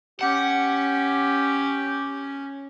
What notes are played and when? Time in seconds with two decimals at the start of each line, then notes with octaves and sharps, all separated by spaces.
0.21 C#4 G4 F#5